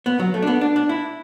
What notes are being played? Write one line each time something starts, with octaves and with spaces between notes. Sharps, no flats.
B3
F#3
A3
D4
B3
D4
D4
E4